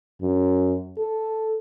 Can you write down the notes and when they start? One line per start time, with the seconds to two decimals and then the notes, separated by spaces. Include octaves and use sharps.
0.22 F#2
0.98 A4